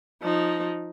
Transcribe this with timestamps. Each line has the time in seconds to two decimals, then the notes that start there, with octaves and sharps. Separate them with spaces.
0.22 F3 D#4